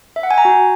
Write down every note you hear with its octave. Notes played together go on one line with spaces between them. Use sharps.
E5
F#5
G#5
A#5
F#4